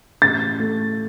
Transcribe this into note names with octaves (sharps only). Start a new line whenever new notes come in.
A1 A6
A3